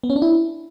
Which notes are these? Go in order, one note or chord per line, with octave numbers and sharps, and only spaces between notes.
B3
C#4
D4
E4